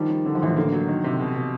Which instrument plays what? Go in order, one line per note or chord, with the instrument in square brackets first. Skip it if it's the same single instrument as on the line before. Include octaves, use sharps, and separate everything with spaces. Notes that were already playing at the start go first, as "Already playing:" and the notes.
Already playing: [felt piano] D#3 [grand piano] F3 G3
[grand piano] G3
D3
[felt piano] F3
[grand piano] A1 [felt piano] E3
[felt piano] D#3
[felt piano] D3 [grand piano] A#3
[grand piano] F#3
D#3
C3
B2
B2